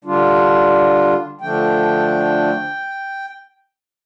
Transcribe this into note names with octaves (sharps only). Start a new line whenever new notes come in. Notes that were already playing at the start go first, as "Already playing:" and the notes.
D3 G3 D4 F4
D3 F3 A3 D4 G5